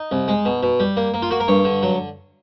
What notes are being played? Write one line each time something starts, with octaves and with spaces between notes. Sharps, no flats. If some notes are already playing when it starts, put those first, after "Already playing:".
Already playing: D#4
C2
G#3
B2
B2
G3
A#3
A#3
F4
A#3 F#4
A#4
G2 C#5
D3
F#3